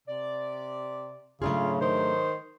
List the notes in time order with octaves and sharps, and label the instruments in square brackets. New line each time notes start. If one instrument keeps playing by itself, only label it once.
[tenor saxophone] C3 [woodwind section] D5
[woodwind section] G#2 F#3 [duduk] C#3 [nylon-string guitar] A3 D4 G#4 [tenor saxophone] F4
[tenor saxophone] D#3 [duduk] C5